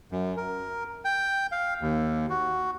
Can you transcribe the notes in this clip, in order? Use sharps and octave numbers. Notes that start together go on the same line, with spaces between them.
F#2
A#4
G5
F5
D#2
F#4